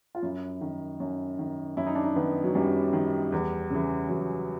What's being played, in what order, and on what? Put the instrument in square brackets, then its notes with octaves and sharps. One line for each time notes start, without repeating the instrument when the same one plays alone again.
[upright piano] F4
F#2 E4
D#3
F#2
D#3
F#2 E4
D#4
D4
D#4
D#3 B3
F#3
F#2 G3
D#3
E2
C#3 E3
E2 F#3